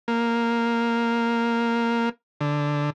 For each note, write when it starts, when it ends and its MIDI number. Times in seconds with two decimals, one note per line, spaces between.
0.08 2.09 58
2.41 2.90 50